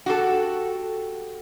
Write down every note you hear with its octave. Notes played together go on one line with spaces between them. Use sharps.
F#4 G4 A4